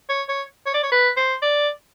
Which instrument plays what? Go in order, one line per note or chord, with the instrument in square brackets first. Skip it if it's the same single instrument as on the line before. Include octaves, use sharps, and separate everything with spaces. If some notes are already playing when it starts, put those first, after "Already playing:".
[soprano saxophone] C#5
C#5
C#5
D5
C#5
B4
C5
D5